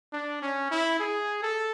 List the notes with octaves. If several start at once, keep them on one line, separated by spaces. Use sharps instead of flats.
D4
C#4
E4
G#4
A4